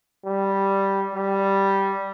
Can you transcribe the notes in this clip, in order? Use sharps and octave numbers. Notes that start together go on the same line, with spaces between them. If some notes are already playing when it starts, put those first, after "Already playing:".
G3
G3